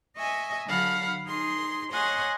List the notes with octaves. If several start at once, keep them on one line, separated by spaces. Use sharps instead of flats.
D#5 E5 G#5 C#6
D3 F#3 F5 F#5 B5
D#4 G#4 C6
G#4 C#5 D#5 F#5 G#5 C6